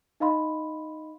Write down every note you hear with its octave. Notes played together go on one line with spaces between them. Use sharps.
D#4 D#5 F5 B5 C6